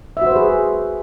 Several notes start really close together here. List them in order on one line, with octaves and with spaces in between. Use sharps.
E5 F#4 C5 B4 G#4